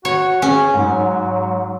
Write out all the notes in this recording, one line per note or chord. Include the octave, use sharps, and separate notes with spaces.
F#4 C#5
C#4 G#4
G#2 F#3